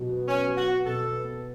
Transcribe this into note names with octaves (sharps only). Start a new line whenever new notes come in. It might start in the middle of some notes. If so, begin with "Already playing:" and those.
Already playing: B2 F#3
B3
B3 C#4
F#3
F#4
B3
B2 A4
B3
B3